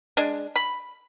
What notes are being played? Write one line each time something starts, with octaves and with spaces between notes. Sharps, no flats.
G#3 D4
B5